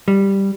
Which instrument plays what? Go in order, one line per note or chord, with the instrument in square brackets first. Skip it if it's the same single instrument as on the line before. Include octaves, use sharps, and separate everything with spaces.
[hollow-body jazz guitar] G3